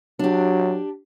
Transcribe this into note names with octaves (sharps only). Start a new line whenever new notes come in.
F#3 D4 G4